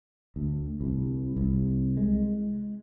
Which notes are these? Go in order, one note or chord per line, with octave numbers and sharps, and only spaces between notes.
D2
C2
C2
G#3